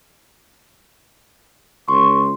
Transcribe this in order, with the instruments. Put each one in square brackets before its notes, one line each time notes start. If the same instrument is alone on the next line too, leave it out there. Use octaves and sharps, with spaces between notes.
[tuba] C#2 [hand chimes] C6 [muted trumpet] C#6